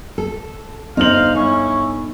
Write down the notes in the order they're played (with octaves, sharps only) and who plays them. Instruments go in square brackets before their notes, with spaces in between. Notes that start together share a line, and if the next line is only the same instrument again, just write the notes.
[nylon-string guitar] A4
[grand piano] G1 F#7 [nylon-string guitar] D#4 D#5 [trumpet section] C5 F5
[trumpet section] C#4 E4 C#6 [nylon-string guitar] D#4